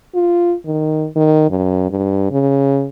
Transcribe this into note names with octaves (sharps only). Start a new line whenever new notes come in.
F4
D#3
D#3
F#2
G2
C#3